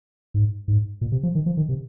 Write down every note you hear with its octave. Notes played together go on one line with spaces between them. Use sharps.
G#2
G#2
A#2
C3
F3
D#3
F3
D#3
C3